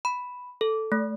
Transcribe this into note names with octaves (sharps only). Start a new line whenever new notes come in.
B5
A4
A3